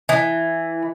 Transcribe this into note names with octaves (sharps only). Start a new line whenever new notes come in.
E3